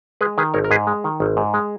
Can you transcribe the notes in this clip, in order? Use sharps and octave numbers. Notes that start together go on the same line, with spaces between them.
G#3 G#4 B4
D#3 G#4 B4
G#1 A#4 C#5
A#4
G#2 G#4 B4
G#3
D#3
G#1
G#2
G#3